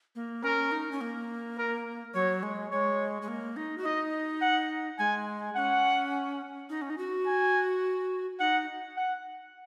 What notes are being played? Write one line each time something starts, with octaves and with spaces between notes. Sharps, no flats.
A#3
C#4 A#4
D#4
C#4
A#3
A#4
F#3 C#5
G#3
G#3 C#5
G#3
A#3
D#4
F#4
D#4 D#5
F#5
G#3 G#5
C#4 F#5
D#4
C#4
D#4
F#4
G#5
D#4 F#5
F#5